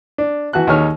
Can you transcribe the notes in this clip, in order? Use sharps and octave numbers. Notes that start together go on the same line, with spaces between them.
D4
E3 F#4 A5 F#6
D#2 D#4 G#4 C#5 F6